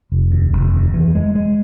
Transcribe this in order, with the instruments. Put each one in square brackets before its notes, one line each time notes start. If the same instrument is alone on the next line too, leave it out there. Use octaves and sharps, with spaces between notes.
[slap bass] F1
D#2
F1
D#2
E3
G#3
G#3